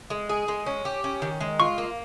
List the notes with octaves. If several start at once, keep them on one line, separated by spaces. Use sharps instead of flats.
G#3
G#4
G#3
C#4
G4
C#4
D#3
G#3
F4 C#6
A#3